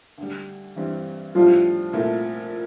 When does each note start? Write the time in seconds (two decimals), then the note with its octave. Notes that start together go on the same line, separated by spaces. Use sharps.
0.18 D2 D3 G3
0.76 G2 E3 G3 C4
1.35 A2 F3 G3 D4 F4
1.93 C2 A#2 A3 E4